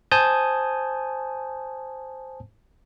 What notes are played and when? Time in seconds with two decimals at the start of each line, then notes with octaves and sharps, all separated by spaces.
0.11 C5 G#5 A5 D#6 G6